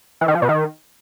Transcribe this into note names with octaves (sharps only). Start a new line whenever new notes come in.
E3
D#3
F3
B2
D#3